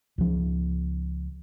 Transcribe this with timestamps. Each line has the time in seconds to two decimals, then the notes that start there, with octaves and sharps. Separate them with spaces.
0.18 C#2 F3